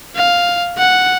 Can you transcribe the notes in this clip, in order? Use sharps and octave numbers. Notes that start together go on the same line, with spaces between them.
F5
F#5